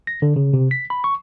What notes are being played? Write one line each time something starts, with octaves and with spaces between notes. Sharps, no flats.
A#6
D3
C#3
C3
B6
B5
C#6